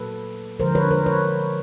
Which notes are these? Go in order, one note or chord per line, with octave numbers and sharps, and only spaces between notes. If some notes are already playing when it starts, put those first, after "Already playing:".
Already playing: A#2 F#3 A#3 A4 B4
D3 F3 G#3 A#4 C5
B4 C#5
A#4 C5
B4 C#5